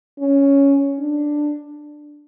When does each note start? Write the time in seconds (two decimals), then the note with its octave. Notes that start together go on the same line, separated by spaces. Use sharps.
0.19 C#4
0.99 D4